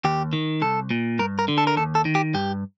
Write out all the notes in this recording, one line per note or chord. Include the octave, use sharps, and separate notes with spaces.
D#2 G4
D#3
C2 A4
A#2
G2 A#4
A#4
D3
A4
A#4
D#2 A4
A4
D#3
G4
G2 G4